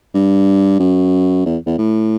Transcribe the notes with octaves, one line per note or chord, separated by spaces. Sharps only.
G2
F#2
E2
E2
A2